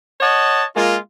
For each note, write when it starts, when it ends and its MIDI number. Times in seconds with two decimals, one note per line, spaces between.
0.21 0.64 73
0.21 0.64 75
0.21 0.64 78
0.21 0.64 81
0.76 0.97 56
0.76 0.97 58
0.76 0.97 65